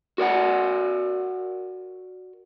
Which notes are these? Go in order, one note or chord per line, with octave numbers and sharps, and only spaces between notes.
F#4 A#4 D5 F#5